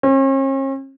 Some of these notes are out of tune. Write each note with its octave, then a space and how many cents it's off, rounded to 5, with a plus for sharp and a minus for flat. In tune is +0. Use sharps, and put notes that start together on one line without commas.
C#4 -45